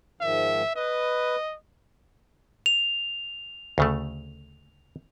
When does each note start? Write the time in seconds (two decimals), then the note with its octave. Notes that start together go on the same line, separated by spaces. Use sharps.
0.21 G#2 D#3 F3 E5
0.76 B4 D#5
2.66 F7
3.78 D2 C#3 A3